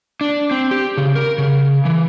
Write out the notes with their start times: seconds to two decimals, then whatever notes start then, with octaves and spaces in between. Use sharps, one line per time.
0.21 D4
0.51 C4
0.71 G4
0.97 C#3
1.16 A#4
1.38 C#3
1.85 E3